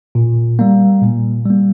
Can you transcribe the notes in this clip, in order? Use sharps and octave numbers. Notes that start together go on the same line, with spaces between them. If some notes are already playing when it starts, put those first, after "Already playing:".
A#2
G3 A#3
A#2
G3 A#3